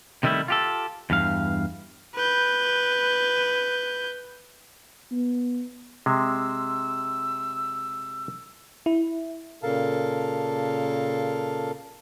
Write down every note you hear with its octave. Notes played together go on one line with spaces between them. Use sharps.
C3 D#3 G3 A3 E4
F4 G4 A4
E2 G2 F5
B4 G6
B3
C3 G#3 E6
E4
A#2 C#3 A4 A#4 F5 A5